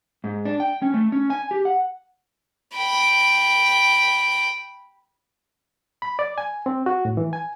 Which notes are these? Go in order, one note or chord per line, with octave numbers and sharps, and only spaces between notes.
G#2
D4
G5
C#4
A3
C#4
G#5
G4
F#5
G5 B5
B5
D5
G#5
C4
F#4
A2
E3
G#5